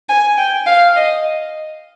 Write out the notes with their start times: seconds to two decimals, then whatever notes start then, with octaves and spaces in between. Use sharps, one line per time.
0.09 G#5
0.37 G5
0.67 F5
0.96 D#5